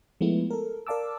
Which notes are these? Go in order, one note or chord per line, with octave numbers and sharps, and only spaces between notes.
F3 G#3 A3 B3 E4
A4 A#4
A#4 D5 F5 A5 D6 E6